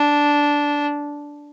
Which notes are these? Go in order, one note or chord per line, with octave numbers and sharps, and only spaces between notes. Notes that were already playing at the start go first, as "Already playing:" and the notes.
Already playing: D4